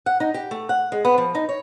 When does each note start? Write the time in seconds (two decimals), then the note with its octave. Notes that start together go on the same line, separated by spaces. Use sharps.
0.06 F#5
0.20 D#4
0.34 G4
0.51 A3
0.69 F#5
0.92 G#3
1.05 B3
1.18 F3
1.35 D#4
1.49 C#5